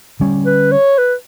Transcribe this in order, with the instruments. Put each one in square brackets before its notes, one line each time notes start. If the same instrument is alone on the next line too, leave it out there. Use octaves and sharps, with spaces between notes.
[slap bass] D3 G3 C#4
[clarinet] B4
C#5
B4